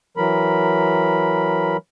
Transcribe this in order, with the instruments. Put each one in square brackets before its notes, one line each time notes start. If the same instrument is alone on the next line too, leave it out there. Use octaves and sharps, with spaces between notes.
[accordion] E3 F#3 A#4 B5